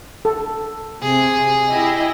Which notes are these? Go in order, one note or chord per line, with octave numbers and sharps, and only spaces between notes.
A4
C3 G#4
E4 G4 D#5